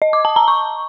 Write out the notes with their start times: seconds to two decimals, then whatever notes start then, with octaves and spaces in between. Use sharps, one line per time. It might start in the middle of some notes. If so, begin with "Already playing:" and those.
0.02 D#5
0.13 D6
0.25 A5
0.36 A#5
0.48 C#6